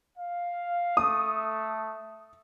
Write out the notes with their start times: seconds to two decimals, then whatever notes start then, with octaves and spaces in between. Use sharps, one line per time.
0.17 F5
0.97 A3 D#6